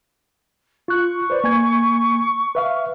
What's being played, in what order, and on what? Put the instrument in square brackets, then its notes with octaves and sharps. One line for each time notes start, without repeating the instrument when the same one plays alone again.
[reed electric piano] F4 F#6 [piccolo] C#6
[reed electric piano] B4 C5 D5
A#3 G#5 G#6
B4 E5 F5